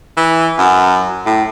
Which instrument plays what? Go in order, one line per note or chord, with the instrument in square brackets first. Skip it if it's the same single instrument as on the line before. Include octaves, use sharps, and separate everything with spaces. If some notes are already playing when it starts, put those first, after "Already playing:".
[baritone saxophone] E3
F#2
A2